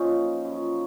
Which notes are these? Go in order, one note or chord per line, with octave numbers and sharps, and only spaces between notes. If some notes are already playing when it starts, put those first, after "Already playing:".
Already playing: F#2 A#2 F3 C#4 D#4
F#2 F3